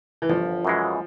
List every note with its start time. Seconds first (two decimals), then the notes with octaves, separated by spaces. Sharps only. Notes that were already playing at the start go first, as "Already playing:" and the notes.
0.22 E3
0.29 G1 F3
0.65 F#2 C#3 E3 G#3